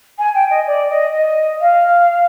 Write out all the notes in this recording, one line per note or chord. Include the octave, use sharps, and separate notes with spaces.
G#5
G5
D#5
D5
D#5
D#5
F5